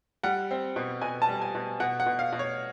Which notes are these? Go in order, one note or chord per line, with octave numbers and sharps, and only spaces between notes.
G3 F#5
C4
B2
B2 G#5
A5
G3
G#5
B2
B2 F#5
F#5
B2
F5
B2
C#5